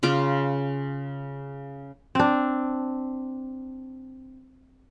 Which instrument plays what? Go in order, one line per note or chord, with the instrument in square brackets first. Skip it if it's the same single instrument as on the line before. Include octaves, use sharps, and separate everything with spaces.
[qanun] C#3 F4 D6
[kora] C4 D4